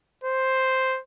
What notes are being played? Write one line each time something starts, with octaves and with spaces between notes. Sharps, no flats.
C5